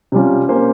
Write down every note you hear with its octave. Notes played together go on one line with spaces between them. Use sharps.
C3 G3 C#4 F4
A#3 C#4 G4 C5